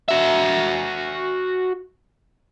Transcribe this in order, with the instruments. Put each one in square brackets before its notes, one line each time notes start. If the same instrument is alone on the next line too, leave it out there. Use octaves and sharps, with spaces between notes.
[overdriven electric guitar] F#4 E5